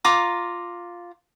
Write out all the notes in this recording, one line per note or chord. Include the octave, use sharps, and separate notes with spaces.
F4 A#5 D6